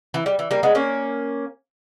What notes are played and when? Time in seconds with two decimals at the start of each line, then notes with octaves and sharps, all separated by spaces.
0.14 E3
0.26 G3
0.39 E3
0.51 G3 A#3
0.63 G#3 B3
0.75 A#3 C#4